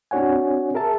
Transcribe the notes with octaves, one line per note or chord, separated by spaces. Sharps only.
C4 D4 F#4 C#5 F#5 G#5
G#4 A#4 E5 A5